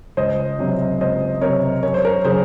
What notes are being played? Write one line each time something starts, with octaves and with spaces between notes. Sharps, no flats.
C#2 C5 D#5
C3 F#3 C4
C#2 C5 D#5
C3 F#3 C4 A#4 C#5
F#2 C#5
C5
A#4 C#5
C#3 F#3 G#4 C5